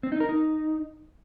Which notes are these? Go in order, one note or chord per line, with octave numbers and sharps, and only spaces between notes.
C4
D#4
A#4
D#4